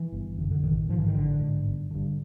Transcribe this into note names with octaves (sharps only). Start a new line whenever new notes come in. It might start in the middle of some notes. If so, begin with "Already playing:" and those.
Already playing: E3
G1
F#2 D3
D3
A1 D#3
G#2 F3
E3
D#3
A1 D3
G#2
G1
G2 D3